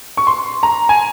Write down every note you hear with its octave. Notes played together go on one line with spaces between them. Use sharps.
C#6
C6
A#5
G#5